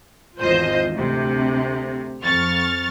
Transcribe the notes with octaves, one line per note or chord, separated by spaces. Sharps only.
G#1 E2 F4 C5 D#5 G6
D2 C3
F2 C#6 F6 A6